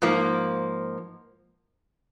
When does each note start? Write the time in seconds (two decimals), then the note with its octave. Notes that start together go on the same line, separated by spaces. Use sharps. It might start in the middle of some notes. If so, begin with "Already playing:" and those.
0.02 G#2 F3 A#3